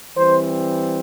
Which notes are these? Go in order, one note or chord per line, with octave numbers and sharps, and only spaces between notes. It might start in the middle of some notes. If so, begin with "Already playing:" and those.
E3 G3 C4 C5